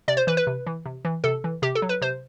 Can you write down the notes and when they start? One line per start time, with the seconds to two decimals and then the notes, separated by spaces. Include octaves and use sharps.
0.08 C3 D5
0.17 C5
0.27 E3 B4
0.37 B4
0.47 C3
0.67 E3
0.86 C3
1.05 E3
1.24 C3 A4
1.44 E3
1.62 C3 G4
1.75 A4
1.82 F#3
1.89 B4
2.01 C3 C5